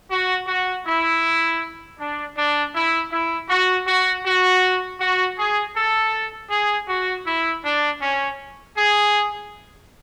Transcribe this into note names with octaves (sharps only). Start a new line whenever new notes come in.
F#4
F#4
E4
D4
D4
E4
E4
F#4
F#4
F#4
F#4
G#4
A4
G#4
F#4
E4
D4
C#4
G#4